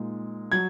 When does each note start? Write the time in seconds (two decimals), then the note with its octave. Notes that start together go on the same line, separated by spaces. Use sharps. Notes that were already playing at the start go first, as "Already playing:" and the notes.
Already playing: A#2 G#3 D#4
0.52 F#3 G#6